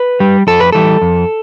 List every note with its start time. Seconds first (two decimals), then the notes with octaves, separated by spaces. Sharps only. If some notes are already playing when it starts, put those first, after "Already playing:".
Already playing: B4
0.20 G3
0.47 F2 A4
0.60 B4
0.72 E3 G3 A4
1.02 F2